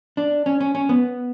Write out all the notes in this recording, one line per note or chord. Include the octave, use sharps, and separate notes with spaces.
D4
C#4
C#4
C#4
B3